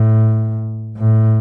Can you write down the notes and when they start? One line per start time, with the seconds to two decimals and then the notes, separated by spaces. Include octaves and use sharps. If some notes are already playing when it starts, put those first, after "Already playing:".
Already playing: A2
0.97 A2